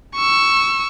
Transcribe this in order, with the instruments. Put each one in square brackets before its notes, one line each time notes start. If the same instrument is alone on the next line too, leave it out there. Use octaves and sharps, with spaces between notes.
[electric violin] C#6 E6